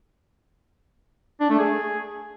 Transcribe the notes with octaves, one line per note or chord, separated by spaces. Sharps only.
D4
A3
G#4